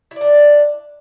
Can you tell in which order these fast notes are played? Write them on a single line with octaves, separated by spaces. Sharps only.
E4 D5 D4